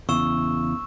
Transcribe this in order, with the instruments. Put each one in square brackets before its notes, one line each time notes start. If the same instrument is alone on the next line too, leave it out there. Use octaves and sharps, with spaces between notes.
[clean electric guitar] E2 C#3 [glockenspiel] C#6 E6 E7